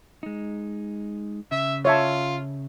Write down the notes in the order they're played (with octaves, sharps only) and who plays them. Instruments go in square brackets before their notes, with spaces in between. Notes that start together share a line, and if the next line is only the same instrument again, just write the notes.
[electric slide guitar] G#3 D#4
[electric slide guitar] C#3 [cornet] E5
[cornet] F4 [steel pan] C#5 E5 A5